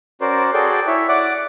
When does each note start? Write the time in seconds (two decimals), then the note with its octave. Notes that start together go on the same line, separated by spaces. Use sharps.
0.21 C#4 F#4 A#4 C5 D5
0.54 F#4 G#4 A4 D5 G5
0.87 E4 C#5 E5
1.09 D5 F#5 D6